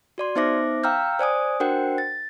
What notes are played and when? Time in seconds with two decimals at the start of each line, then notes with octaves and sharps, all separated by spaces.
0.18 F#4 D5 C6
0.36 B3 D#4 C5 E5 D6 A#6
0.83 F5 G5 A#5 E6 F6 G6
1.19 C5 D5 G#5 D#6
1.60 D4 F#4 A#4 C5 F#5 G5
1.98 A6